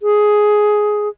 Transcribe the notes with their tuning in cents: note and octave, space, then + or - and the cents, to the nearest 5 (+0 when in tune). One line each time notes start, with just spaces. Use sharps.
G#4 +10